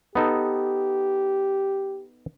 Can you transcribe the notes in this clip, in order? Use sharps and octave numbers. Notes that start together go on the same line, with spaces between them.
B3 D#4 G4 A4